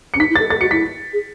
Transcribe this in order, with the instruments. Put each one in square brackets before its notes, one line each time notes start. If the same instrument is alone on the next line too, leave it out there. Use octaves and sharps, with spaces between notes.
[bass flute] C#4 [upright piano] C#7
[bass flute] D#4 [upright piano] B6
[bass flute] E4
[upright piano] A6
[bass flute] A4
[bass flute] A4 [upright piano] A6
[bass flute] F#4 [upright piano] C#7
[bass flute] E4 [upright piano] B6
[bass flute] G#4